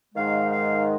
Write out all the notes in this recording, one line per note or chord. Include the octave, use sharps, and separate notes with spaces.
G#2 D#3 G#3 F5
F5